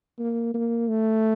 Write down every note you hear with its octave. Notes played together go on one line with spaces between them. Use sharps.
A#3
A#3
A3